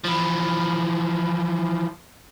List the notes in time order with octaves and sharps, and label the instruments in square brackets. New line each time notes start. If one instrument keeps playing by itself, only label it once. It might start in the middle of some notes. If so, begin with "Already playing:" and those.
[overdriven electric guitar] E3 F3